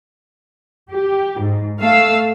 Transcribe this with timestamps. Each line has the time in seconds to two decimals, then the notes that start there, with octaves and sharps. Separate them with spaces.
0.91 G4
1.40 G#2
1.80 A3 F5 E6